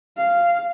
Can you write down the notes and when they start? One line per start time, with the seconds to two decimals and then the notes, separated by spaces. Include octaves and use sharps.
0.18 F5